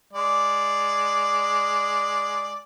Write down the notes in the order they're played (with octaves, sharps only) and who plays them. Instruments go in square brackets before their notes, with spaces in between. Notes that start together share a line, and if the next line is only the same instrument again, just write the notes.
[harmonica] G#3 D5